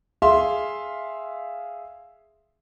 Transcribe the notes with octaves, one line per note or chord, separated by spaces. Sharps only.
G#4 E5 F5 C6